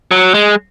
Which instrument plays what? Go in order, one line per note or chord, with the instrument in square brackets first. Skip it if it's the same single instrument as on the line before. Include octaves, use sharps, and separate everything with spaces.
[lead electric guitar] F#3
G#3